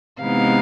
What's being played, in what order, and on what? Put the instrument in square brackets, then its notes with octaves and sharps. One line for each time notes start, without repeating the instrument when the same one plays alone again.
[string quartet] C3 E3 G#3 B3 D#4 F5